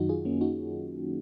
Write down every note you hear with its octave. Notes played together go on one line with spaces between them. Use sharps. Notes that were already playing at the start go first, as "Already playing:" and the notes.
Already playing: F#2 D#3 F#3 D#4 F#4
F4 G#4
A#3 C#4
D#4 F#4